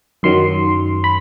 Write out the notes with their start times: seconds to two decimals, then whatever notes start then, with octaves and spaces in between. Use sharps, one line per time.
0.23 F#2 D#3 F#3 C6
1.04 B5